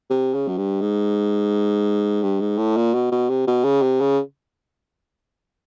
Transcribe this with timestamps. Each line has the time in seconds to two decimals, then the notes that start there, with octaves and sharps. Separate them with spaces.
0.10 C3
0.35 C#3
0.48 F#2
0.57 G2
0.81 G#2
2.23 G2
2.40 G#2
2.58 A2
2.77 A#2
2.94 B2
3.12 B2
3.30 C3
3.47 B2
3.64 C#3
3.82 C3
4.00 C#3